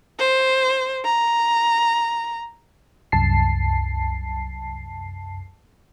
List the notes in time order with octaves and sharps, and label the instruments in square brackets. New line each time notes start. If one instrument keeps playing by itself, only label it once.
[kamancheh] C5
A#5
[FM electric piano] C2 F#2 A5 C7